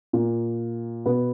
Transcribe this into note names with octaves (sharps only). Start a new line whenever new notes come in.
A#2
B2 B3